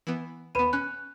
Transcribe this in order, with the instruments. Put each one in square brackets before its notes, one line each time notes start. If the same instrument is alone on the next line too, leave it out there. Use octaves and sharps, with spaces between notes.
[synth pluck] E3 B3
[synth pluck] D#2 B3 [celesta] B4 B5 D#7
[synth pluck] C#4 [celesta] F#6